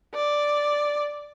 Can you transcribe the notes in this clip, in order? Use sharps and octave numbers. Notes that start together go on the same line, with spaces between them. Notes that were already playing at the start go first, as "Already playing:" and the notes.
D5